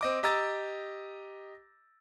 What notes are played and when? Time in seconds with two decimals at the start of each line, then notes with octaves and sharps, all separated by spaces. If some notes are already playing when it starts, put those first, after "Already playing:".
0.01 C4 D#5 D6
0.23 G4 D#5 A#5 E6 A6